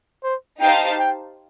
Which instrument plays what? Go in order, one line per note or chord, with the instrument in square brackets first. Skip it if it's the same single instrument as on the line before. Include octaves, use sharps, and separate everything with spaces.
[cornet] C5
[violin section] D#4 G4 C5 F5 A5 [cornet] G5
[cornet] G5